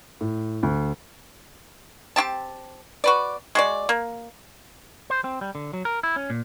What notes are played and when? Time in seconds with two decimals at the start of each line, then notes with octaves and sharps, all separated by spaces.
0.21 A2
0.63 D2
2.16 C4 F4 G4 A5
3.04 F#4 B4 D5
3.55 G#3 F#4 D5
3.89 A#3
5.10 C5
5.24 C4
5.41 G3
5.55 D3
5.73 F#3
5.85 A#4
6.03 E4
6.16 C#4
6.30 A#2